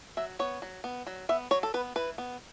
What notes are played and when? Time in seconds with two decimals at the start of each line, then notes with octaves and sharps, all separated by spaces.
0.17 F#3 E5
0.39 B3 C#5
0.62 F#3
0.84 B3
1.07 F#3
1.29 B3 E5
1.51 F#3 C#5
1.63 A4
1.74 B3 B4
1.96 E3 B4
2.18 B3